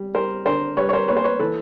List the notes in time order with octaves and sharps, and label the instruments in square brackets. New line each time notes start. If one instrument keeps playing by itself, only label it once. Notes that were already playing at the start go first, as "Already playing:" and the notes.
Already playing: [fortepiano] G3
G3 A#4 C5
D3 A#4 C5
G3 B4 C#5
C#5
A#4 C5
A#3 B4 C#5
C5
B4 C#5
E3 A4 B4